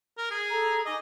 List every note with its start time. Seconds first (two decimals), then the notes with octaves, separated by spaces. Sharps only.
0.18 A#4
0.31 G#4
0.50 A4 A#5
0.86 D#4 D#5 G#5 D6